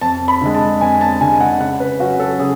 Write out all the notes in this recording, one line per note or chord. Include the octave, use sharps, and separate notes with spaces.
F2 A5
B5
D3 G#3
A5
F2 G#5
A5
D3 G#3 G#5
F#5
C#3 F#5
B4
F#3 C#4 F#4
A4
C#3 G#4